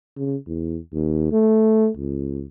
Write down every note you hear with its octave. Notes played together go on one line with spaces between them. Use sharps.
C#3
E2
D#2
A3
C#2